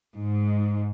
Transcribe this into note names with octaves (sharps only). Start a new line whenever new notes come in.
G#2